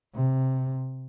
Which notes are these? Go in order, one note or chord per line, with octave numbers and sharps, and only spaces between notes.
C3